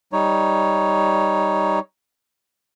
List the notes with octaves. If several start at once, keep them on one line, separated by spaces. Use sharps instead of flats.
G3 D#4 C#5